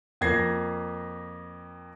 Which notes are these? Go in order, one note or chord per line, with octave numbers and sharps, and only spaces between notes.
F2 A#3 G#6 A#6 C7